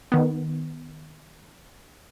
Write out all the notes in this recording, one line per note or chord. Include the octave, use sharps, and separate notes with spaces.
D#3 B3